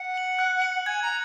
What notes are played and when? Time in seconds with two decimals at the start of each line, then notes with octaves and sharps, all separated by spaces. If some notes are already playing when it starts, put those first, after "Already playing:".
Already playing: F#5
0.14 C#7 F#7
0.39 F#6
0.62 C#7 F#7
0.86 G#5 G#6
1.02 A#5